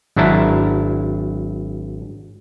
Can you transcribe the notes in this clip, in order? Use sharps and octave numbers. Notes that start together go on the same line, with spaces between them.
G#1 F#3 D4 E4 A5 A#5